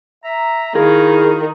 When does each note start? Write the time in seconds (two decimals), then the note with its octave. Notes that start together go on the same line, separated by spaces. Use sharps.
0.24 E5 A#5
0.75 D#3 E4 F#4 G#4 A#4 F5